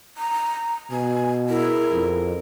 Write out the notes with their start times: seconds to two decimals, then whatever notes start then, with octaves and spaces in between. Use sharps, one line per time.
0.17 A#5
0.91 B2 G#5
1.49 E4 G#4 A#4
1.91 F2